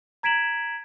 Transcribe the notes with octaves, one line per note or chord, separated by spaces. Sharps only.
A#5 G#6 B6 D7 E7 F#7